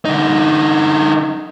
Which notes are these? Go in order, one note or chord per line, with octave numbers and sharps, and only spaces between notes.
D3 D#4